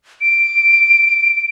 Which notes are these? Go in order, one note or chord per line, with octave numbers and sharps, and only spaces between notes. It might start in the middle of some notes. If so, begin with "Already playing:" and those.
D7